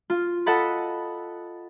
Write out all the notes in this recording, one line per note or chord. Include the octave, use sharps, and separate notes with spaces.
F4
A4 D#5 F#5 A5 B5